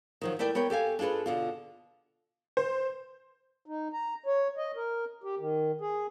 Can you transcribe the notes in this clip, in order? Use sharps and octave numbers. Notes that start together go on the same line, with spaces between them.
D#3 F3 F#3
A3 E4 A#4 D5 G5
B3 A#4 C#5 G5
G4 A4 F5 G#5
D4 F4 G#4 A4 B4
B2 D3 F4
C5
D#4
A#5
C#5
D#5
A#4
G4
D#3
G#4